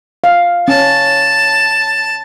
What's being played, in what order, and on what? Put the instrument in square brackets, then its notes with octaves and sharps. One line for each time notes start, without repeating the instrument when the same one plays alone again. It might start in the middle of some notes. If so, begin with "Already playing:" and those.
[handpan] F5
[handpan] C#4 [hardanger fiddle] A5